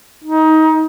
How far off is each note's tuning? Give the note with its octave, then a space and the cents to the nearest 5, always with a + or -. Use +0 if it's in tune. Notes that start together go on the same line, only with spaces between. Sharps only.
D#4 +20